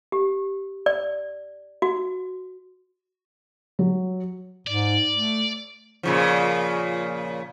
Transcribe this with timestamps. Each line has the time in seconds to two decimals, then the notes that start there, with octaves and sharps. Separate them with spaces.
0.12 G4
0.86 D5
1.82 F#4
3.79 F#3
4.67 G#2 D5
5.13 A3
6.03 A#2 C#3 F3